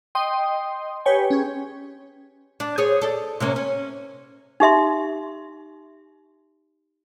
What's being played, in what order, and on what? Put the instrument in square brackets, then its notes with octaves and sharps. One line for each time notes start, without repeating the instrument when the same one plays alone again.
[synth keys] D#5 G5 C6 D#6
G4 B4 C#5 G5 G#5
C#4 G#4
[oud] D4
G#4 C5 C#5
A4 D5
C3 A#3 C#4
C#4
[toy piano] D#4 G4 E5 C6